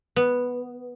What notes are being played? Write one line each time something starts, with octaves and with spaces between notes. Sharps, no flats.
B3